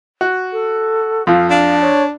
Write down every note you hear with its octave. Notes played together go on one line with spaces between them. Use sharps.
F#4
A4
F2 F3 F5
D4 F5
C#5